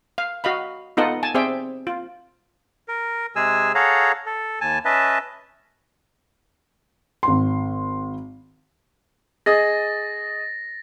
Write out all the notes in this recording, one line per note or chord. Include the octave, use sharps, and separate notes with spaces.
F5
F#4 D#5 F5 B5
B3 D#4 F4 A4 D#5 F#5
G#5 A5
C4 G#4 C5 D5 E5 G5
F4
A#4
C3 G#3 G#4 G#5 E6
G#4 A4 C#5 F5 F#5 A#5
A4
D#2 G#5 A5
C#4 B4 D#5 E5 A5
G#1 C6
G#4 D#5 D#6 A6 A#6